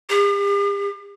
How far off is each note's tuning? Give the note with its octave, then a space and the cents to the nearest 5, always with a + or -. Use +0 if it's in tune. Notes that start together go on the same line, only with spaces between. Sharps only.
G4 +45